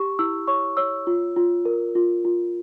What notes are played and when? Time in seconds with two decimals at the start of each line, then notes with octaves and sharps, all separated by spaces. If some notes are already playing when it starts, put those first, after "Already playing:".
Already playing: G4 C#6
0.19 E4 E6
0.47 C#5 C#6
0.77 C#5 E6
1.07 F4
1.36 F4
1.65 A#4
1.95 F4
2.25 F4